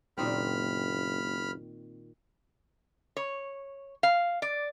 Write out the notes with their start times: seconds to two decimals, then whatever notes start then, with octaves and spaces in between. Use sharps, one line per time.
0.18 F#1 A#2 D#3 C4 B5 F6
3.17 C#5
4.03 F5
4.42 D5